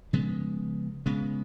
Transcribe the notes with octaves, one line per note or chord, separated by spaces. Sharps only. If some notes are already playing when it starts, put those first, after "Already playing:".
C#3 F3 G#3 B3
C#3 G#3 B3